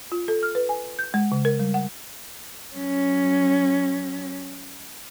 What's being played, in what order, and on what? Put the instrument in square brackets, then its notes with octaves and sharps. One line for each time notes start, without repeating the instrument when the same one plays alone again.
[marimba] F4
A4
F6
B4
G#5
G6
G#3
C#3
A#4
G3
F#5
[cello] F#3 C#4